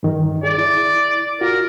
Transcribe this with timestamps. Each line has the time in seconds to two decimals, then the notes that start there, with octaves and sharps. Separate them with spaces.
0.03 G2 D#3
0.43 G#4 D5
0.58 E4
1.41 F4 F#4 A#4